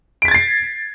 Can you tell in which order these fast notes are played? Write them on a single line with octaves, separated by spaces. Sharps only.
D7 B6 G#6 A6 C7